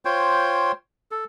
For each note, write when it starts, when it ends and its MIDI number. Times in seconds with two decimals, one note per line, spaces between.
0.05 0.72 65
0.05 0.72 72
0.05 0.72 73
0.05 0.72 79
1.11 1.24 69